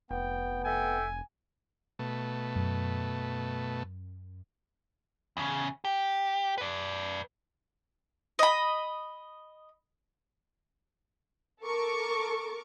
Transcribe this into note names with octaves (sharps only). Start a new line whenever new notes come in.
F1 B3 G5
A4 E5 G5 G#5
B2 A3
F#2
E2 C#3
G4
B4 D5
D#5 B5
A4 A#4 C#6 D6